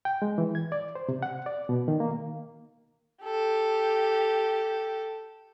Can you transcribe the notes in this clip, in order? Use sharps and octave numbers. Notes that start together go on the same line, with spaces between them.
G5
G#3
E3
G#6
D5
C5
C3
F#5
D5
B2
D#3
A#3
G4 A4